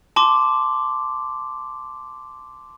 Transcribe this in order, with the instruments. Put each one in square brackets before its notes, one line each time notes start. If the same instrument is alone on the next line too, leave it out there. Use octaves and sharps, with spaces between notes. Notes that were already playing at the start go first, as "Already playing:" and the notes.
[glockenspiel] A5 C6 D6